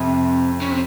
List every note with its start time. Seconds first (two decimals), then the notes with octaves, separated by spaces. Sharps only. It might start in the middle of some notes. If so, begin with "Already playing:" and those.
Already playing: F2 C3
0.61 C#3
0.71 C3